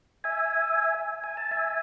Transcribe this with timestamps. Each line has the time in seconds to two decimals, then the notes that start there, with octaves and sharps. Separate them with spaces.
0.24 E5 G#5
1.24 G#5
1.37 A5
1.51 E5 G#5